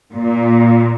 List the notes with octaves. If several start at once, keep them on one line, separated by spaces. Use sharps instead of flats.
A#2